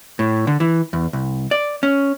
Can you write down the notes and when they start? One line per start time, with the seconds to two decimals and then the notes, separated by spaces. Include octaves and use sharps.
0.19 A2
0.47 D3
0.60 E3
0.93 E2
1.13 C2
1.51 D5
1.83 C#4